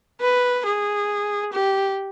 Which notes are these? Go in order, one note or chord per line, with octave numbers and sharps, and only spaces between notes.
B4
G#4
G4